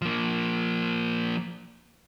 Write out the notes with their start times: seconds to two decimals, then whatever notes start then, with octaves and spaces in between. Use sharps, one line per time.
0.02 F3 A#3